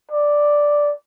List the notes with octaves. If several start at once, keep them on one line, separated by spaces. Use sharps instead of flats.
D5